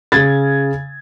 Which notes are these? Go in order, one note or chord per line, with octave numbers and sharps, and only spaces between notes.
C#3 G#6 A6